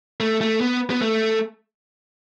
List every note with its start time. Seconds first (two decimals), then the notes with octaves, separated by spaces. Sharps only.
0.20 A3
0.41 A3
0.61 B3
0.90 B3
1.01 A3